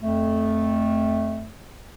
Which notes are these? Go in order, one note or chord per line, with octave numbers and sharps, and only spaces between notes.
F2 A3